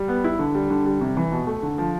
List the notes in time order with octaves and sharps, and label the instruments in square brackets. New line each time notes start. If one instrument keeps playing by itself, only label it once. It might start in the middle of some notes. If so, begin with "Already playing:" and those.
Already playing: [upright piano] G3
B3
E4
D3
G3
D3
G3
C3
E3
B2
A3
D3
F3